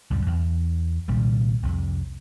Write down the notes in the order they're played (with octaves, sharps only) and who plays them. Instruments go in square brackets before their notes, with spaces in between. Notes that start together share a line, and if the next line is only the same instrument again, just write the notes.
[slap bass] C#2 F#2 A2 G3
E2
C2 A#2 D#3 G3
C2 F2 C3